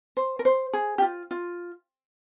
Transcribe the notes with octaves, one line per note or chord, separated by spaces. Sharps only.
C5
A#4
C5
G#4
G4
F4
F4